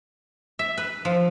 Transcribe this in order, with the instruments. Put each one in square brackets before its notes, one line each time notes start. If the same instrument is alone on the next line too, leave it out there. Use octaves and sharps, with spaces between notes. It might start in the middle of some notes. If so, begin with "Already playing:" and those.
[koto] E5
B4
F3